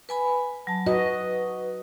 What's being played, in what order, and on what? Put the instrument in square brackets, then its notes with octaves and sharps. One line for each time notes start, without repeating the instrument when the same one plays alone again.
[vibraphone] B4 G#5 B5
F#3 A5
[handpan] F#4 D#5 [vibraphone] B4